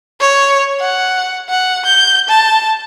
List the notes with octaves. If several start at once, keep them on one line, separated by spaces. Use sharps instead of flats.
C#5
F#5
F#5
G6
A5